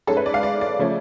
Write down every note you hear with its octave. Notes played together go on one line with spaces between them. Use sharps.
G#2 G#3 C#4 A4
B4
D5
F5
D5
D5
C#3 F3 A3 C#4